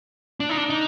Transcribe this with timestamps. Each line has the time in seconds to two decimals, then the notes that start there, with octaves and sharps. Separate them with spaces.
0.40 D4
0.49 D#4
0.57 D4
0.70 D#4